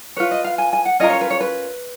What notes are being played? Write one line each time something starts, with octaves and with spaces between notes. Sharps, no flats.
F4 B4 C#5
D#5
F5
G#5
G#5
F#5
C#4 F4 A#4 D#5
C#5
B4
C#5
B4